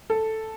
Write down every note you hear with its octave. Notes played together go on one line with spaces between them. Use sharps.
A4